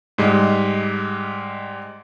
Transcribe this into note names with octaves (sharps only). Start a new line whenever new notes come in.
G#2 G3 G#3